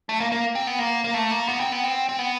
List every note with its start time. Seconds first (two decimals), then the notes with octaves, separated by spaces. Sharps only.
0.09 A3
0.20 A#3
0.32 A#3
0.55 C4
0.67 B3
0.79 A#3
1.04 A#3
1.14 A3
1.31 A#3
1.48 B3
1.60 C4
1.72 B3
1.84 C4
2.09 C4
2.19 B3